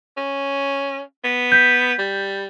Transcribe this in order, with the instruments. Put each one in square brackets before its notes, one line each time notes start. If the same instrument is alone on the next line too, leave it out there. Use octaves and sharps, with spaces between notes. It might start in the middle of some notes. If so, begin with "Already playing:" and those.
[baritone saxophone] C#4
B3
[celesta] G6 B6
[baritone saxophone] G3